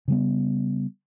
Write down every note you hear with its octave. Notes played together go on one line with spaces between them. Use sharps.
C#3 G3 B3